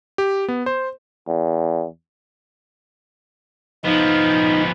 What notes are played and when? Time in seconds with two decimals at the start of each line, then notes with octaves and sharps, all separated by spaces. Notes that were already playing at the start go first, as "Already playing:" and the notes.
0.18 G4
0.48 B3
0.66 C5
1.28 E2
3.84 F3 B3 D#4